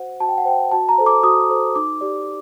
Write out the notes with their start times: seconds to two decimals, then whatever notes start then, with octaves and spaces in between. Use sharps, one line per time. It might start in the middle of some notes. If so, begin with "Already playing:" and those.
Already playing: F#4 C5 F#5
0.20 F#4 A5
0.29 G5
0.38 F#5
0.45 C5 G5
0.72 F#4 A5
0.89 A#5
0.98 A4 C5
1.06 D6
1.23 F#4 D#6
1.50 A4 C5
1.76 D#4 D6
2.01 G4 D5